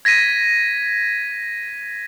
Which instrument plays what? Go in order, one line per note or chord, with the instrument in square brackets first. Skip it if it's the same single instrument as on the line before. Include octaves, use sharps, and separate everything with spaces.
[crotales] G#6 A#6 B6 D#7